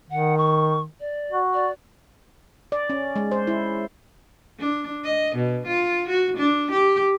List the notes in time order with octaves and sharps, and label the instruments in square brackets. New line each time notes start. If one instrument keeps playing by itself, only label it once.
[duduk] D#3 [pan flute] F#5
[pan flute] C#6
D5
[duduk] F#4
[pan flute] D5
[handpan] D5
C#4
G#3
C5
E4
[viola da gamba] D4
D#5
B2
F4
F#4
D4
G4